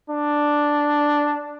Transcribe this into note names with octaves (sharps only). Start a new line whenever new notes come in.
D4